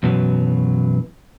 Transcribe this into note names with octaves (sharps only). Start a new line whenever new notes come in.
F#2 B2 E3 F#3